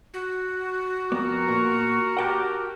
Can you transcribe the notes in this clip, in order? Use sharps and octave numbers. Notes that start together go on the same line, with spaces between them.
F#4
F2 B3 A#4 A#5 C#6
A#2
G4 A#4 F#5 G5 A5